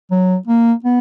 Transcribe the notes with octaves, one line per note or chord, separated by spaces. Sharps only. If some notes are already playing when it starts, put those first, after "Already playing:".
F#3
A#3
B3